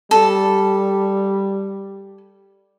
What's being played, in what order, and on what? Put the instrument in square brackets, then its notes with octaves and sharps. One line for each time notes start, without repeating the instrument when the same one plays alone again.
[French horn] G3 [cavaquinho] A4